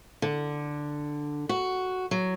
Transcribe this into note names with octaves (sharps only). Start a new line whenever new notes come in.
D3
F#4
F#3